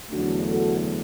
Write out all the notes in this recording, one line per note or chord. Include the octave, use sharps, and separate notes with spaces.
E2 D3 F#3 A3 D4 F#4
F#4 A4